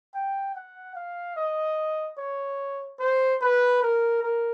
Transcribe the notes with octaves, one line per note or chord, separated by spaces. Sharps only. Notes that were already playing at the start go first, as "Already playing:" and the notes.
G5
F#5
F5
D#5
C#5
C5
B4
A#4
A#4